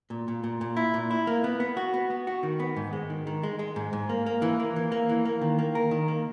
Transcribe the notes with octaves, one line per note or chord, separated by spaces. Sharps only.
A#2
A#2
A#2
A#2
E4
A#2
E4
A#3
B3
B3
F#4
B3
B3
F#4
D#3
B3
G#2
G#3
D#3
D#3
G#3
G#3
G#2
G#2
A#3
A#3
E3
A#3
E3
A#3
E3
A#3
D#3
A#3
A#4
D#3
A#3